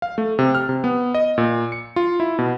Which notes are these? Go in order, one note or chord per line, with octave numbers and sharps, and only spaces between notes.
F5
A3
C3
F6
C3
B3
D#5
A#2
C#7
F4
E4
B2